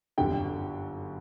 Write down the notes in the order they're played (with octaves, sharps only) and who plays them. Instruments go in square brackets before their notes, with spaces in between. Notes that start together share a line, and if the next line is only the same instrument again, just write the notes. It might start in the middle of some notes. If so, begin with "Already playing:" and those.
[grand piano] G1 F#2 D3 G4 G5